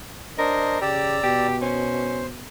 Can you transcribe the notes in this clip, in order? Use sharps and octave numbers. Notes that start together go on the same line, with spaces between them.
D4 A#4 C5 D#5
C#3 G4 D5 A#5 E6
B2 G4
C#4 C5